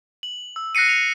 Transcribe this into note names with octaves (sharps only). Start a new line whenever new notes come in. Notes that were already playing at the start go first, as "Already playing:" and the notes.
F#7
E6
F#6 A#6 C7 C#7 D#7
F7